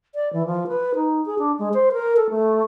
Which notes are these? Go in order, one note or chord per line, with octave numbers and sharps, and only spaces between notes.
D5
E3
F3
B4
D#4
G#4
D4
G#3
C5
A#4
A4
A3